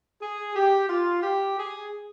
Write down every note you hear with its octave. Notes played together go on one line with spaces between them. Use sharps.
G#4
G4
F4
G4
G#4